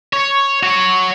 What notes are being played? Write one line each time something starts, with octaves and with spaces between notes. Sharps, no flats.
C#5
F#4 C#5